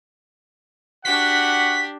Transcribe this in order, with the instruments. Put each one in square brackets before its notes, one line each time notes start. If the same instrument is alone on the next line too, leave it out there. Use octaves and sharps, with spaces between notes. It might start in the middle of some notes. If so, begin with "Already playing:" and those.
[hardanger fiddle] D4 G4 [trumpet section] F#4 F#5 [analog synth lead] B6